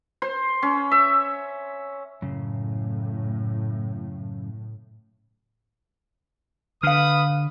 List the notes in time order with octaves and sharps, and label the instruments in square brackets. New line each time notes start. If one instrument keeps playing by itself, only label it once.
[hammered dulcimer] C5
C#4
E5
[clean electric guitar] F#2 C#3 [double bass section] A2
[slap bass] D3 [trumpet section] B4 D#6 [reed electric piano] F5 F6